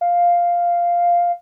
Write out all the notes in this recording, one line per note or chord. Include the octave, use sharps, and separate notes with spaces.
F5